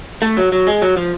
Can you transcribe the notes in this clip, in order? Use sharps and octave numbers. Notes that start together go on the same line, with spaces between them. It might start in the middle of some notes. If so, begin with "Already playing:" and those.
A3
F#3
F#3
G#3
F#3
F3